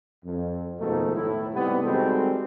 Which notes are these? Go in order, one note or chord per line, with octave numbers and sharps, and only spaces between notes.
F2
D#2 G#2 B2 D#3 F3 A3
A2 E4
G#2 C3 G3 B3
D#3 G3 G#3 C4 F#4 A4